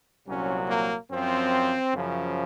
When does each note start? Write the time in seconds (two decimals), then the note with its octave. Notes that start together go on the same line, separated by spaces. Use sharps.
0.27 C2 A#2 F#3 C#4
0.68 A#3
1.10 F#2 F3 C4
1.93 F#2 C#3 F3